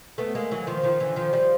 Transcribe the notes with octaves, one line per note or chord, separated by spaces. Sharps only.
A3 B3
G#3 A#3
E3 F#3
D#3 F3
D#3 F3
D3 E3
D#3 F3
F3 G3